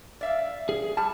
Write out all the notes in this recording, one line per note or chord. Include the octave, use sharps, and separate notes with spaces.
D5 E5 F5
G#4
G3 A5